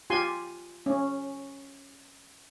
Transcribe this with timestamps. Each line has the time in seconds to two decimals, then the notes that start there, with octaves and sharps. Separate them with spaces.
0.10 F4 G4 G#5 C6
0.86 C#4